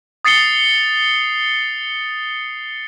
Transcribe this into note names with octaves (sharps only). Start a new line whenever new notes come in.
D#6 A6 C7 C#7 G7